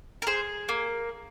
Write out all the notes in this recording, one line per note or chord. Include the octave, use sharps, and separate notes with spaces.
A#4
G#4 C5
A#3